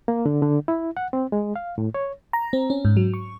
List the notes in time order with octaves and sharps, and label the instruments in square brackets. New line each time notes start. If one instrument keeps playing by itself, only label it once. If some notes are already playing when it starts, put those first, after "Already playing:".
[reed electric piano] A#3
D3
D3
E4
F#5
C4
G#3
F5
A2
C#5
[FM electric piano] A#5
C4
C#4
G#2
F#3
C#6